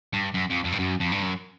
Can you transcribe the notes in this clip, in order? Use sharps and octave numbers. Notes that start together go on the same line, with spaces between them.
G2
F#2
F2
F2
G2
F#2
F2
G2
F#2